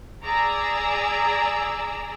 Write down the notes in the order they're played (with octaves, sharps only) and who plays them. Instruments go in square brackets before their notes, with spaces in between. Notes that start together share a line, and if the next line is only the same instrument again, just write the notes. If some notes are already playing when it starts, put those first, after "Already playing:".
[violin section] G#4 D5 A#5 E6